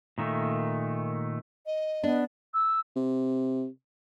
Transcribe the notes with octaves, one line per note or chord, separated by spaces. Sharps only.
A#2 D#3 A3
D#5
B3 D4
E6
C3